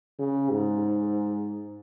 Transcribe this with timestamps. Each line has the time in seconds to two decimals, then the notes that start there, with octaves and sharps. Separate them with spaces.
0.19 C#3
0.50 G#2